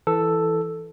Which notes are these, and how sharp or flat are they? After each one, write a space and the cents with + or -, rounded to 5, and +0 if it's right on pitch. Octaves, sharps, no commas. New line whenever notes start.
E3 +0 A4 +0